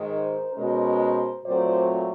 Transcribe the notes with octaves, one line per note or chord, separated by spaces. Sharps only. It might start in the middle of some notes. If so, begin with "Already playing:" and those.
Already playing: G#2 D#3 G#3
A#4 C5
B2 G#3 C#4 A#4 C5
A#2 F#3 A3 C4 C5 D5